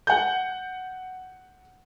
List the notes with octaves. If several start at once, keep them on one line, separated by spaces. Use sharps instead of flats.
F#5 G6